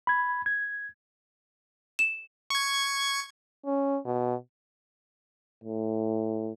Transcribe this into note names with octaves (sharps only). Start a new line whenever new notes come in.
B5 G#6
G#6
E7
C#6 G#6
C#4
B2
A2